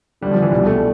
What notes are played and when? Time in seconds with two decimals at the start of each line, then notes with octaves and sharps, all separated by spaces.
0.21 D2 D3 G3
0.31 F3
0.42 E3
0.52 C2 B2 G3
0.66 A3